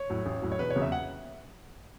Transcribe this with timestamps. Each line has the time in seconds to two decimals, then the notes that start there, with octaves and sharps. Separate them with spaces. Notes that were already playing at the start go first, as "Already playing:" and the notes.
Already playing: C#5
0.10 A2 F#3
0.26 A1
0.42 A2 F#3
0.52 C#5
0.59 E1 B4
0.70 C#5
0.76 E2 C#3 F#3
0.82 E5
0.92 F#5